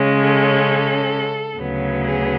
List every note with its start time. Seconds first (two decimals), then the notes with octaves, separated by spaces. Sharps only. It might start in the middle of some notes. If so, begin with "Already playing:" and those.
Already playing: C#3 G#3 C#4
0.19 A4
1.58 D2 C#3 F#3 B3
2.04 G#4